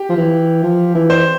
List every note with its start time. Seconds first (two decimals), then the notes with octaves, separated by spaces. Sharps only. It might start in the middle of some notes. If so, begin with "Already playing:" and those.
Already playing: G4
0.09 F3
0.16 E3
0.63 F3
0.95 E3
1.10 C5